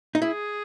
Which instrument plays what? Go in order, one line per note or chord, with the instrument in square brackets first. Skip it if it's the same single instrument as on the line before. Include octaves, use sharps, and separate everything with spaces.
[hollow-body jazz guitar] D#4
[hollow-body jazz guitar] E4 [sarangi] G#4